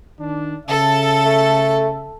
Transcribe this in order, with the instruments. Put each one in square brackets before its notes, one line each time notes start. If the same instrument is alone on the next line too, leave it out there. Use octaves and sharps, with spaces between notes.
[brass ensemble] D#3 D4
[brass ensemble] C#3 E5 [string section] A4
[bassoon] A3